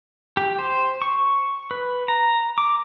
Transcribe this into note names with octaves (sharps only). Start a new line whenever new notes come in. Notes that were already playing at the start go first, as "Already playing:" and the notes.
G4
C5
C#6
B4
A#5
D6